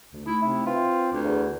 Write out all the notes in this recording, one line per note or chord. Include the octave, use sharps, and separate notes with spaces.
D2
A3 D#4 E4 B5
C3 E4
C4 F4 B4
D2 D4 B4
E2